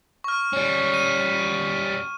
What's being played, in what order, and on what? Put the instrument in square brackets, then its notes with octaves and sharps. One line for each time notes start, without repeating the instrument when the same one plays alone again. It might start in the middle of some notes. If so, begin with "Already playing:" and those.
[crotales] C#6 F6
[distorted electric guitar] G3 C#4
[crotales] D#7